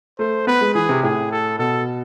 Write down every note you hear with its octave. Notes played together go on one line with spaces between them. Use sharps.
A3 C5
B3 B4
G#3
E3 G#4
C3
A2 G#4
A4
B2 A4